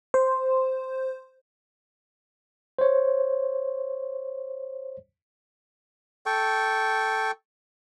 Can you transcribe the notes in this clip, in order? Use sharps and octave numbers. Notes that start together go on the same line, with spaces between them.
C5
C5 C#5
A4 G5 C#6